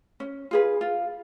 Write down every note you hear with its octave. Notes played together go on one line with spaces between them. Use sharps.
C#4
F4 G#4 B4
F4